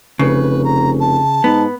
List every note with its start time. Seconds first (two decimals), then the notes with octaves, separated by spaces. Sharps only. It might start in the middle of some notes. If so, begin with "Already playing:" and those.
0.19 F1 C#3 B4
0.64 A#5
1.00 A5
1.44 G#2 B3